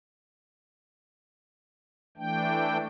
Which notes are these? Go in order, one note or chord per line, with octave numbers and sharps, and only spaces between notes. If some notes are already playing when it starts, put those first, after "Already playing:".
E3 A3 D4 G5